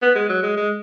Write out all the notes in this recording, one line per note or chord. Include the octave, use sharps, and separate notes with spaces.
B3
G#3
F#3
G#3
G#3